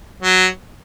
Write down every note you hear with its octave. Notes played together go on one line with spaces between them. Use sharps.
F#3